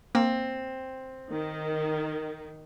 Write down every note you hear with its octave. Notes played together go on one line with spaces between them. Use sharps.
A#3 C4
D#3